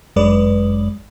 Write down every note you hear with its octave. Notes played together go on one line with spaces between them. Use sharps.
G1 F#2 G#3 B4 D5